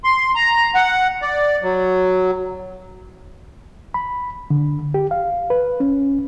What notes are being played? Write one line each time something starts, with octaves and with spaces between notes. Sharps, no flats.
C6
A#5
F#5
D5
F#3
B5
D3
G4
F5
B4
C#4